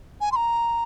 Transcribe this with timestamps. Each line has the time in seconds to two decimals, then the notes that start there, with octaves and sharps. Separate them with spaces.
0.21 G#5
0.32 C6
0.36 A#5